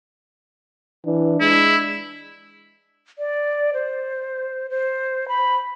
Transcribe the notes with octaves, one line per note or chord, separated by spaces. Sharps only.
E3 D4
G#3 E4
D5
C5
C5
B5